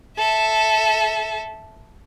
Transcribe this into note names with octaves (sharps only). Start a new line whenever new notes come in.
A4 E5